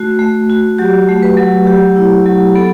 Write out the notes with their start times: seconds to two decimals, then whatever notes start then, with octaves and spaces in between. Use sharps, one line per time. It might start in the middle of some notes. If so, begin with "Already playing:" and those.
Already playing: A3 F#4
0.19 A3
0.50 F#4
0.78 F#3 G4
1.08 A3
1.23 B4
1.37 F#3
1.67 F#3 G4
1.96 E4
2.26 F#3
2.55 B3 A4